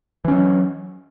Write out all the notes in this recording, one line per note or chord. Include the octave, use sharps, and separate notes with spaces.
E3 F#3 C#4